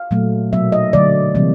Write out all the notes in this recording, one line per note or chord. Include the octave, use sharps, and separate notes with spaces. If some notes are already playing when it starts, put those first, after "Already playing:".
Already playing: F5
A#2 F#3 A3
B2 F#3 A#3 E5
D#5
D3 F#3 A3 D5
C3 E3 G3 A#3